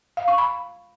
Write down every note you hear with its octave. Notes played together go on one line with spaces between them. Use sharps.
F5
C#6
B5